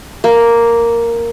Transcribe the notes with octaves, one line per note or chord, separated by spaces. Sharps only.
A#3